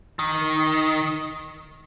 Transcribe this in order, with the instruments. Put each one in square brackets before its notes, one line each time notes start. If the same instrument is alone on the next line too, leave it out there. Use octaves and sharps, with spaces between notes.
[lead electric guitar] D#3